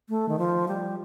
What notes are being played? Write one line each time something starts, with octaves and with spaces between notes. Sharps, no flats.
A3
D#3
F3
G3